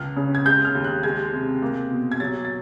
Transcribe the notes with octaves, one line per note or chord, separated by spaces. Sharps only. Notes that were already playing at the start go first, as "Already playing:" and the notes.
Already playing: C#2 F6
C#3
G#6
G#3 G6
F6
D#2
F#6
G#3 G#6
C3
A#3
B2
G#6
F#3 A6
A6